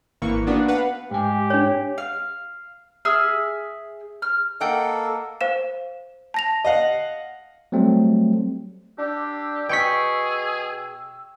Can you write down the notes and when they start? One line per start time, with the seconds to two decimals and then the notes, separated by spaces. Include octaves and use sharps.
0.22 G#1 E3 A#3 C#6
0.47 A#3 B3 D4 F#4 B4
0.68 B4 F5 F#5
1.11 G#2 G4 G#5
1.50 D4 C#5
1.98 F5
3.05 G#4 E5 E6 F6
4.22 F6
4.61 A#3 A4 D#5 F#5 G5
5.41 C5 F5 E7
6.34 A5 A#6 F7
6.65 D#5 F5 F#5
7.72 F#3 G3 A3 C4
8.98 D4 G4 E6
9.69 B2 G#4 G5 C#6 B6